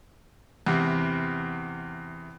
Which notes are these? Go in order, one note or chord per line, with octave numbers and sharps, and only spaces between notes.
E2 C3